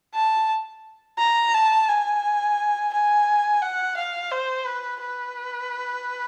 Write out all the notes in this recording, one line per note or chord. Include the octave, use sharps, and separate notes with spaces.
A5
A#5
A5
G#5
G#5
F#5
F5
C5
B4
B4